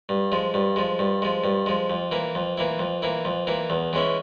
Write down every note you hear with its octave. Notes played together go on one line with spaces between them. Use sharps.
G2
F3 G#3
G2
F3 G#3
G2
F3 G#3
G2
F3 G#3
F2
E3 A#3 E4
F2
E3 A#3 E4
F2
E3 A#3 E4
F2
E3 A#3 E4
E2
E3 G#3 C#4 E4